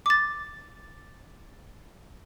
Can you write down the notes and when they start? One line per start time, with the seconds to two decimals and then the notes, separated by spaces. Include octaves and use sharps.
0.06 D6 A6